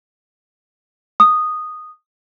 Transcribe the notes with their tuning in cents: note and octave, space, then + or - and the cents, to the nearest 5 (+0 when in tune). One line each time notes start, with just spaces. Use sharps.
D#6 -10